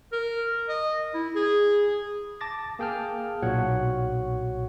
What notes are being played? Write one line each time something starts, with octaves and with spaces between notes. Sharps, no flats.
A#4
D#5
E4
G#4
A5 D6 A6 A#6
A#3 G#4 G5 A5 F6
B1 A#2 F#4 C#5 F#5